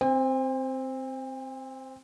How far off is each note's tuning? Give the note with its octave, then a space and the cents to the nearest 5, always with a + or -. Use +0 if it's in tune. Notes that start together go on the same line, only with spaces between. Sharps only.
C4 +0 G5 +45